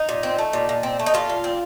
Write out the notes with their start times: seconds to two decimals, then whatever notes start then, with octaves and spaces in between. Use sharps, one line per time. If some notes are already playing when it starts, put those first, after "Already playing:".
Already playing: D#4
0.09 A#2
0.23 C4
0.39 A3
0.53 A#2
0.69 A#2
0.83 C4
0.99 A3
1.06 D#4
1.14 A#2 F4
1.29 A#2
1.44 C4